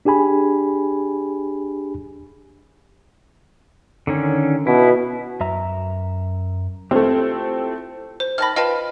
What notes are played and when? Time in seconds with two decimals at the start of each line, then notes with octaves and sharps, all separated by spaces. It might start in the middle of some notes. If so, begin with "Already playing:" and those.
0.05 D4 G4 G#4 G#5 B5
4.07 D3 D#3 C#4
4.67 B2 E4
5.40 F#2 E5 A#5
6.91 A3 C4 E4 F4 G4
8.20 C5
8.38 D#3 A5 B5 F6 A#6
8.56 F4 B4 D#5 G5 A5